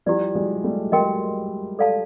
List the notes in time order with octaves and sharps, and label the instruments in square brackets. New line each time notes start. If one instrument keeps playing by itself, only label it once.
[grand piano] F3 G3 [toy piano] E4 G4 B4 D5
[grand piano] F#3 G#3
G3 A3
[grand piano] F#3 G#3 [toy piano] A#4 D#5 G5 C6
[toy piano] A4 D5 F5 A5